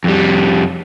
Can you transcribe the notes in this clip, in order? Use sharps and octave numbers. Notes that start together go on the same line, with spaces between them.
F2 G3